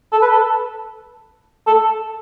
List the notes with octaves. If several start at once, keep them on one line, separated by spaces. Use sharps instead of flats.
A4
B4
A4
A4